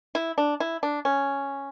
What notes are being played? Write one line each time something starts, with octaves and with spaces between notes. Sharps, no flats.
E4
D4
E4
D4
C#4